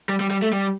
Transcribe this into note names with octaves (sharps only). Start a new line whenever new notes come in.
G3
G3
G3
A3
G3